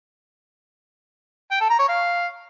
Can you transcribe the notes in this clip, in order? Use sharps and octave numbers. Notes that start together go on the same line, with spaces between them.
G5
A4
A#5
C#5
F5